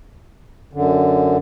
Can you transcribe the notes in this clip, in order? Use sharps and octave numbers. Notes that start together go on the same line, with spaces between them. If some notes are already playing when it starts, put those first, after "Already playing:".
F#2 D3